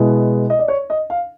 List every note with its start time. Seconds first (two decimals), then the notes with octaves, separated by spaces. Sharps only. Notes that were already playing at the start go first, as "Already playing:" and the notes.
Already playing: B2 G#3 B3 E4
0.50 D#5
0.59 D5
0.68 C#5
0.90 D#5
1.10 F5